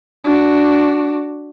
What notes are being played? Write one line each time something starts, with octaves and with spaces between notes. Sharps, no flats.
D4 F#4